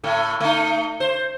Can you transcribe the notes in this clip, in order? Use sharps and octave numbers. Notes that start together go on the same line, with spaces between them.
A2 A3
A3 D#4
C5